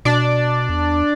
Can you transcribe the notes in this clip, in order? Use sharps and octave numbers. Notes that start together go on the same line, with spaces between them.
B2 D4 D5
E2